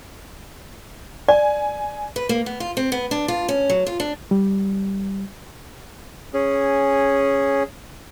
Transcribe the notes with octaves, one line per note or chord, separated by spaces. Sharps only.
D5 G#5
B4
A#3
B3
F4
C4
B3
D4
F4
C#4
F#3
F4
D4
G3
C#4 G#4